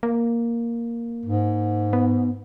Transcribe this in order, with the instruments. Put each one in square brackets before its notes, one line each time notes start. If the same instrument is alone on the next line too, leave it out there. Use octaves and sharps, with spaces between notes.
[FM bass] A#3
[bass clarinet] G#2
[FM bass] B3